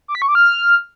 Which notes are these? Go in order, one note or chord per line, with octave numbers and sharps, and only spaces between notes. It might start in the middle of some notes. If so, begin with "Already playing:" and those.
D6
B6
C#6
D6
F6